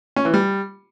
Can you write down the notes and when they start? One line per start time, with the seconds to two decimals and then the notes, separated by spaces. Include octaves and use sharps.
0.16 C#4
0.25 E3
0.34 G3